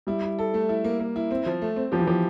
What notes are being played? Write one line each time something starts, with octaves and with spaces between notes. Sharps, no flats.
G3 E4
E4
A4
A3
E4
A#3
A#3
E4
C4
F3
A3
C4
F3 G4
E3
F3 G4